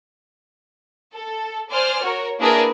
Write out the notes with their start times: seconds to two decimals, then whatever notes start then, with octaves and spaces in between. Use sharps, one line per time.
1.13 A4
1.71 C5 D5 G#5 F6
2.04 F#4 A#4 C#5
2.39 A#3 D4 E4 G#4 A#4 B4